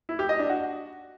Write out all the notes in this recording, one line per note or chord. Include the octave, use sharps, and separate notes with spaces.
E4
G4
D#5
D4
F#4